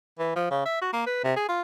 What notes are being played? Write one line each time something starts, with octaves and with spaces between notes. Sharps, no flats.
E3
F3
C#3
E5
F#4
A#3
B4
C3
G#4
F4